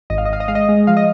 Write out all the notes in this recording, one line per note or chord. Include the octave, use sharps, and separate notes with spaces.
G#1 D#5
F5
D#5
G#1 F5
D#5
G#3 F5
D#5
G#3
F3 F5
D#5